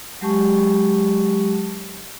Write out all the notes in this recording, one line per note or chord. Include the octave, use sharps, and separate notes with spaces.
F#3 G#3 G4 A5 C#6